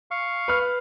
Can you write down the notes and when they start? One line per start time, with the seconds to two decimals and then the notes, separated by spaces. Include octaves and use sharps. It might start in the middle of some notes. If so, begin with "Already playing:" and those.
0.11 F5 C#6
0.48 B4 F6